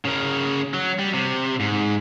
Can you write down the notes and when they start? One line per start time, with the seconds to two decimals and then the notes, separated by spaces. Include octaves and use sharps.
0.05 C#3 A#4
0.74 F#3
0.99 G3
1.14 C3
1.60 G#2